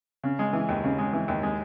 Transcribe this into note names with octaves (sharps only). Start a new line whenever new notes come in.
C#3
G#3
E3
D#2
C#3
G#3
E3
D#2
G#3